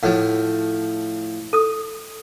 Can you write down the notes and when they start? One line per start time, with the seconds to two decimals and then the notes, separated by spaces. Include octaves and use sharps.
0.03 A2 F3 F#5
1.53 A4 D#6